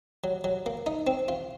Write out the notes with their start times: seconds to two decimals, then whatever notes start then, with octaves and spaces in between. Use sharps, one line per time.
0.24 F#3
0.44 F#3
0.66 A#3
0.86 D#4
1.07 C4
1.28 F4